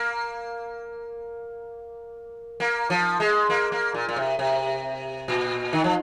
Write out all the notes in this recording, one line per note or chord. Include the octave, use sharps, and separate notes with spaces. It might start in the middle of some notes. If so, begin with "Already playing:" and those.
Already playing: A#3
A#3
F3
G#3
A#3
A#3
A#2
A#2
C3
C3
A#2
D#3
F3